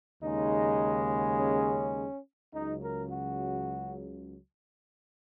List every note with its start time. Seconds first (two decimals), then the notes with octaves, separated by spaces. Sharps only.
0.23 D#2 C#3 G#3 D#4
1.38 C#4
2.53 C#2 C#3 F#3 D#4
2.82 A#4
3.11 F#4